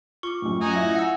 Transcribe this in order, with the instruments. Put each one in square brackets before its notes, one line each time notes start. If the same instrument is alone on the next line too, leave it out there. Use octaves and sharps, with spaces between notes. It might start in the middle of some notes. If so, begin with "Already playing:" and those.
[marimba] F4 D6 [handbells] C#6
[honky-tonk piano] F#2 A2
[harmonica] D#4 F#4 G#5 [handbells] D#6
[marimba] E4 [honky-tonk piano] E5
[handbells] F#5 E6